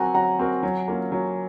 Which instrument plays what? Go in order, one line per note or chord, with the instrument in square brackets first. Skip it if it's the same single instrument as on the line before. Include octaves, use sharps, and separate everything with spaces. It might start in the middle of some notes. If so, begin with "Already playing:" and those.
Already playing: [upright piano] F#3 C4 F#4 A#4 [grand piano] F#5 G#5 A#5
[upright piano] F#3 [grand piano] F#5 A#5
[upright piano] C4 F#4 A#4
F#3
A#3 C#4 F4
F#3